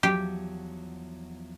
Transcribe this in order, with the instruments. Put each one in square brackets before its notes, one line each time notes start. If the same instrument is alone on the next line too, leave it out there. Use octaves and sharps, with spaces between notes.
[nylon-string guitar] E2 F3 F#3 [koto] G4